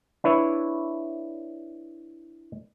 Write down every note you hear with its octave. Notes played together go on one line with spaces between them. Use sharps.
D4 E4 B4 C#5 E5